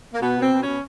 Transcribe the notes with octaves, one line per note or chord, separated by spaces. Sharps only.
A#3
B2 B3
B2 C4
B2
C#4
B2